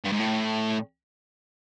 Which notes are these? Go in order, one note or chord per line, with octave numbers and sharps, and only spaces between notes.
G2
G#2
A2